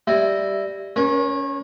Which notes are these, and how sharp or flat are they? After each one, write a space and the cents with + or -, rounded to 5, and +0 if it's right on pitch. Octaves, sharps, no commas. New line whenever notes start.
G3 +0 E4 +0 D#5 -10
C#4 +20 A#4 +40 C#5 -30